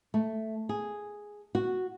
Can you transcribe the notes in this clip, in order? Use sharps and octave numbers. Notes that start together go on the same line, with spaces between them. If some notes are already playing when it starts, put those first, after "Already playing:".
A3
G#4
F#4